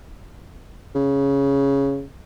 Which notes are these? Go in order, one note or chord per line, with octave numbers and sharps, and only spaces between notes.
C#3